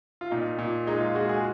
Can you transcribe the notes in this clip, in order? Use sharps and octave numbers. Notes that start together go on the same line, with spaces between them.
F4
A#2 D#4
A#2
G#3 D#4
F4
G#3 F#4
G#4